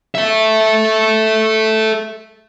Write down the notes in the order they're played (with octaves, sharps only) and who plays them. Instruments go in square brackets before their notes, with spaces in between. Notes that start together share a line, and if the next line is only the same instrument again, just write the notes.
[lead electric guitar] A4 E5